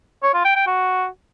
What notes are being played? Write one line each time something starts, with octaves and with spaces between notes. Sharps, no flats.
C#5
F4
G5
G5
F#4